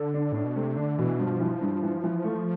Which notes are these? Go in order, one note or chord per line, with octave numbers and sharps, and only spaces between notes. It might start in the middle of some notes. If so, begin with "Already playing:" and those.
Already playing: D3 A4
D4
A2 D4
B2
C3 A3
D3 D4
B2 E3
G2 F3
E3
G2
E3
E3
A3